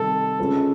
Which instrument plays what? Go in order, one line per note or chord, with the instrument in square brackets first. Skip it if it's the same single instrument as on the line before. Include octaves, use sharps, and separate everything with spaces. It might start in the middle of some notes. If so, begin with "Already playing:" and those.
Already playing: [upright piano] C3 D#3 G3 [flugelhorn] A4
[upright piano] C#2 C#3 F3 G#3 C#4